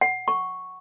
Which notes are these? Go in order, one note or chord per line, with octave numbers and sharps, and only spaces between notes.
F#5
C#6